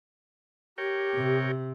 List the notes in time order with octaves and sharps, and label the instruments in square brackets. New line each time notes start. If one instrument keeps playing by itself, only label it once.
[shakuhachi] G4 [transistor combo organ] A#4 C#5 G5
[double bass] C3